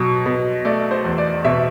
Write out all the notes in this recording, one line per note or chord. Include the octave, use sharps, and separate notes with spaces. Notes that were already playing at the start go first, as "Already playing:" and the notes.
Already playing: B2 F#3
B2
A3 D5
C5
E2
D5
B2 E5